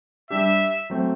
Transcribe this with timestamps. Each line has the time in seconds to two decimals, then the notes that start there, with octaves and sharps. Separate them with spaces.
0.30 G3 D4 G4 E5
0.90 F#3 A3 C4